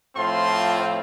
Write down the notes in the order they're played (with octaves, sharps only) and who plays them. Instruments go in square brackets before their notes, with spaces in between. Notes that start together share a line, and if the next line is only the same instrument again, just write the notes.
[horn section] A2 F3 C4 F4 A5 C6